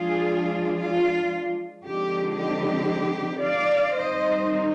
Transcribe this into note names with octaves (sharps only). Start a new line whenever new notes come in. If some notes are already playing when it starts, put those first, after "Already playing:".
Already playing: F3 G#3 D4 F4 G#4
F4
D3 F3 G#3 C4 D#4 G4
G4
D5 F5
D#3 G3 C4 D#4 C5 D#5